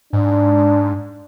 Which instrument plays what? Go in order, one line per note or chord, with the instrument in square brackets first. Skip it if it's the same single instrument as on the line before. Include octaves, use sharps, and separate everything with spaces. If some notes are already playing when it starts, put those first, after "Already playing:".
[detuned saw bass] G#2 [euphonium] D4